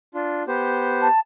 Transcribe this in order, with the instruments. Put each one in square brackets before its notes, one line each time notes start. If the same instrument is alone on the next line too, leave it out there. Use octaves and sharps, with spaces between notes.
[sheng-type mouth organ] D4 F4
B3 G4 C5
[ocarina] A5